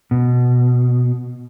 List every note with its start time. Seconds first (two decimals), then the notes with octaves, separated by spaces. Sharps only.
0.11 B2